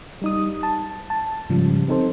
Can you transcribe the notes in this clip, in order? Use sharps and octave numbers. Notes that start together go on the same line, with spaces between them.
G3 D#4 D#6
A5
A5
G#2 C#3 F3 G3
C4 D#4 A4 C5